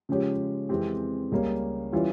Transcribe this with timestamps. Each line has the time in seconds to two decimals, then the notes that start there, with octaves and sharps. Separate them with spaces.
0.09 C#3 F3 G#3 C#4 G4
0.69 F2 E3 G#3 C4 G4
1.32 C#2 C#3 G3 A#3 C#4
1.92 E3 G3 C#4 F4